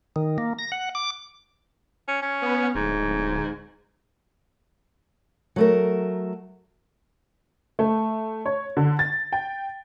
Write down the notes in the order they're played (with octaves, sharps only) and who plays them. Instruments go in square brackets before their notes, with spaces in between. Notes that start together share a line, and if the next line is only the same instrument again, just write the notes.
[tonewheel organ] D#3
A#3
A#6
F#5
D6
[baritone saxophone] C#4
C#4
[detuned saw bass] B3
[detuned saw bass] D1 [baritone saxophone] G#2
[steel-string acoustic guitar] F#3 A3 A#4
[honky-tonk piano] A3
C#5
D3
A6
G5